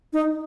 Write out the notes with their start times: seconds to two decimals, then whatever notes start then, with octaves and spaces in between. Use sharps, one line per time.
0.13 D#4